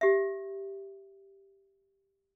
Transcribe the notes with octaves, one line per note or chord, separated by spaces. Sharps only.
G4 E5